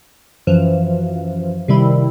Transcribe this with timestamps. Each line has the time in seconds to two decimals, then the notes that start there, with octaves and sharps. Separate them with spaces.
0.47 F#2 E3 F3
1.68 C3 D#3 G3 E4